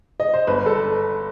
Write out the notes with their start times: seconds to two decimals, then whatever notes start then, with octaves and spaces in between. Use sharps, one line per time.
0.20 D#5
0.33 C5
0.47 G1 B4
0.66 A4